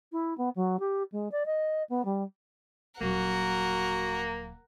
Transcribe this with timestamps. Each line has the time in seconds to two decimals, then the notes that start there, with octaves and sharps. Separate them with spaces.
0.12 E4
0.38 B3
0.55 F#3
0.80 G4
1.12 G#3
1.32 D5
1.46 D#5
1.89 B3
2.05 G3
3.01 D#1 F#3 A#3 F#4 A#4 F#5